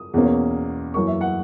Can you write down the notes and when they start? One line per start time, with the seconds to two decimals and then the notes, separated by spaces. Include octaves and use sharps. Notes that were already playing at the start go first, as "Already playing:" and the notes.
Already playing: D#6
0.14 E2 B2 A#3 C#4
0.94 F#2 E3 A#3 C#6
1.07 E5
1.21 F#5